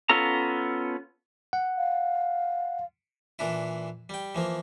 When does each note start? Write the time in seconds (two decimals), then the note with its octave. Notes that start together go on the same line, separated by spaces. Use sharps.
0.09 B3 C#4 F4 A4 A#5
1.53 F#5
1.77 F5
3.39 A#2 E3 D4 E4
4.09 G3 G5
4.35 E3 F3 A#3